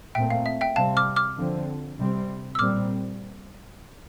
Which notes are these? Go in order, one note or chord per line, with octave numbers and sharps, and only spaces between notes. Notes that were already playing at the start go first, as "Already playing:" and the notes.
A#2 A3 C4 E5 G5
F5
E5
E5 G5
C3 G3 C4 F5 A5
D6 F6
D6 F6
D3 F3 C4
C3 G3 C4
E6
A#2 G3 C4 D6 F6